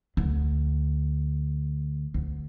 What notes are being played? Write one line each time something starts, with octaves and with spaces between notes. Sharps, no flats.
D2
D2